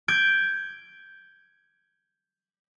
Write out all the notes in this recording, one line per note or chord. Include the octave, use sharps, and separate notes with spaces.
G6 G#6 D7